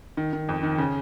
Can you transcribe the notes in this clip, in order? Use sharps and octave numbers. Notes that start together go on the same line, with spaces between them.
D#3
D#3
F2
D#3
C#3